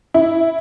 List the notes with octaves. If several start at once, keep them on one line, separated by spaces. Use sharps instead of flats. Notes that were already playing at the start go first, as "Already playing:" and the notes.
E4